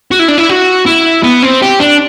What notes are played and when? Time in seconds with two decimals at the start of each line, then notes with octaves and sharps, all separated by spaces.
0.11 F#4
0.19 E4
0.28 D4
0.38 E4
0.49 F#4
0.86 E4
1.24 B3
1.43 C4
1.62 G4
1.80 D4